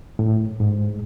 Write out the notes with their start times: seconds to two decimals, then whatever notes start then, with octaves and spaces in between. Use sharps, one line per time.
0.19 A2
0.60 G#2